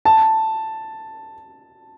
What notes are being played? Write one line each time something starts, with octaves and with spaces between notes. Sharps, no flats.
A5